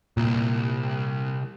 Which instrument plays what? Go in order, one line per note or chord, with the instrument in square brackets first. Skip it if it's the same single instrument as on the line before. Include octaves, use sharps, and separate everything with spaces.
[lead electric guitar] C2 [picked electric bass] A#2